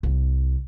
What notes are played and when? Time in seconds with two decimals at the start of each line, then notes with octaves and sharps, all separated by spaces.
0.03 C2